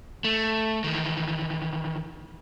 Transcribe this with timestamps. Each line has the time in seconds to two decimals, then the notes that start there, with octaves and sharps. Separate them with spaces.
0.24 A3
0.84 D#3 E3